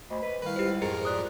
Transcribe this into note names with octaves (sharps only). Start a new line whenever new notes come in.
D2 C5 D#5 B5
B4
D#3 G3 E4 B4 F5
C#2 G4 C5
F2 G#2 G#4 A#4 C5
A#2 D#6 F#6